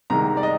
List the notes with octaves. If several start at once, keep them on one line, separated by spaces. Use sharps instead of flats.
C2 C3 D#3 G#3 A#5
D5
D#5